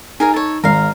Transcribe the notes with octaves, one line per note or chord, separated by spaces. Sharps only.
D#4 G#4 A#4 G#5
A4 C#5
G#1 A#4 F5